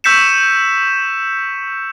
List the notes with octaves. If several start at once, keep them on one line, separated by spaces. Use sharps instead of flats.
C#6 E6 G6 B6 C#7 E7